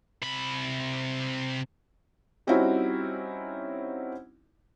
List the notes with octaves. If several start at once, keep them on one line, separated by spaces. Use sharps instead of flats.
C3 B5
G3 C4 C#4 D#4 E4 F#4